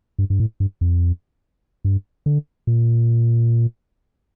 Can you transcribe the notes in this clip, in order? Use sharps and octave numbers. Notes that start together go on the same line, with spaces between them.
G2
G2
A2
G2
F2
G2
D3
A#2